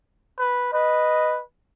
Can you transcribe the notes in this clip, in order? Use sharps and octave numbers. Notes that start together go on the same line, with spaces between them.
B4
B4 D#5